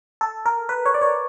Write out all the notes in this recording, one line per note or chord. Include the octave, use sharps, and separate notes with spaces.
A4
A#4
B4
C#5
D5
C#5